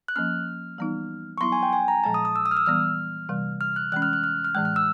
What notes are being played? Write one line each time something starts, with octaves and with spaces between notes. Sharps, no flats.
F#6
F3 A#3 C#4 F6
E3 G3 B3 D#4
C#6
F#3 B3 E4 C6
G#5
G5
G#5
A#5
A#2 F3 G#3 A5
D#6
D#6
E6
D#6
F6
E6
E3 G3 B3 F6
C3 E3 G3
F6
F#6
E3 G#3 C#4 F#6
F6
F#6
F6
F6
A2 E3 G#3 F#6
F6
E6